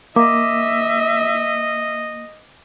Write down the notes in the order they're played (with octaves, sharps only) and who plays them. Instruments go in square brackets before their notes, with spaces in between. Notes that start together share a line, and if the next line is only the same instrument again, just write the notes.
[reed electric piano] A#3 [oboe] D#5 [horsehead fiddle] E5 [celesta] D6